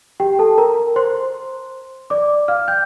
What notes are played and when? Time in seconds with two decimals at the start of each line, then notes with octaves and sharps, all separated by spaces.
0.20 G4 G5
0.39 A4 A5
0.58 A#4 A#5
0.96 C5 C6
2.10 D5 D6
2.48 F5 F6
2.68 G5 G6